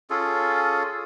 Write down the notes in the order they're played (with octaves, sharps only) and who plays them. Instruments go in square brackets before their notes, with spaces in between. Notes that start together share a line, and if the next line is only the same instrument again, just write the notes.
[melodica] C#4 F4 G#4 A4